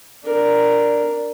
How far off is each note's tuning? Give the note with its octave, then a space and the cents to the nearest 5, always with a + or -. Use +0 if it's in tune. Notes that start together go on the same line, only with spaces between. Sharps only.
D4 +0 A#4 +0